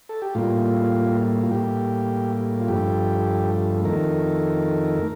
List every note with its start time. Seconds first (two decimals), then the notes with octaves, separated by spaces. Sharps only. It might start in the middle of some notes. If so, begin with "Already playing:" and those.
0.09 A4
0.22 G4
0.35 A2 G3 A#3 F4
1.43 F4
1.51 A2 G3 A#3 G4
2.60 F4
2.68 G2 F3 A3 G4
3.85 F2 D#3 A3 A#4